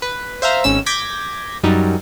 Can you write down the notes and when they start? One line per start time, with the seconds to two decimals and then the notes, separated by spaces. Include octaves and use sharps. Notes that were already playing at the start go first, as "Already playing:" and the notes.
0.02 B4
0.42 C5 E5 F5 A#5
0.64 G#1 C#4 E6
0.86 D6 G6 G#6 A#6 B6
1.63 F#2 G3 D#4